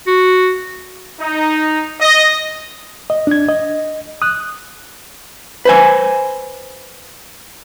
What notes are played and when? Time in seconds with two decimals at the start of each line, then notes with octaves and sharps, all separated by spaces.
0.07 F#4
1.19 D#4
2.00 D#5
3.10 D#5
3.27 D4 G#6
3.49 D#5
4.22 D#6 F#6
5.65 B4 C5 G#5